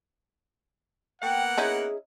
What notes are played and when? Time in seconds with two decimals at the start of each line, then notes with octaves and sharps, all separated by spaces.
1.22 A#3 B3 F#5 G5
1.58 C#4 D#4 E4 G#4